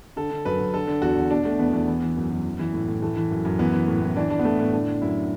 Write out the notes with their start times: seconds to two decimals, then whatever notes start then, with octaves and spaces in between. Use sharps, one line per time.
0.16 D3 A4
0.31 D3
0.45 F#2 B4
0.60 F#2
0.73 D3 A4
0.87 D3
1.02 E2 F#4
1.17 E2
1.30 B2 D4
1.45 B2 A3
1.59 E2 B3
1.73 E2 B3
1.88 E3
2.02 E3
2.17 F#2
2.30 F#2
2.45 E3
2.59 E3
2.74 A2
2.88 A2
3.02 E3 A3
3.16 E3
3.31 F#2
3.45 F#2
3.59 E3 B3
3.74 E3
3.88 A2
4.01 A2
4.16 E3 D4
4.30 E3 D4
4.39 B3
4.45 A2 A3
4.59 A2 B3
4.73 D3 D4
4.87 D3
5.02 F#2 E4